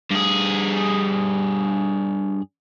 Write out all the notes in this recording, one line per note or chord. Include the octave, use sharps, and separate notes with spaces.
G2 G#4